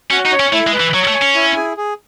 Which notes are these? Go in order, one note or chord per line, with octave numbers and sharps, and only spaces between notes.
C#4 F#4
D#4
C#5
C#4
A3 E4
G#3
B4
E3
F#3 C#5
A3
G#5
C#4
E4
G#4
G#4